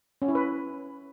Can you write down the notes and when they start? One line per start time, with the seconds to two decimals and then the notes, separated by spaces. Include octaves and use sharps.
0.22 C#4
0.28 E4
0.35 B4